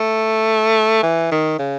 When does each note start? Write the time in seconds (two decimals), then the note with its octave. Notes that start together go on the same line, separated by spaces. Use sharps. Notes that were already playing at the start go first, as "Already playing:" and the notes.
Already playing: A3
1.03 E3
1.32 D#3
1.59 C#3